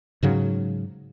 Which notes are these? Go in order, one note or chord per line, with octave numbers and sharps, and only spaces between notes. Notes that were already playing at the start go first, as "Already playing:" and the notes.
G#2 C#3 F#3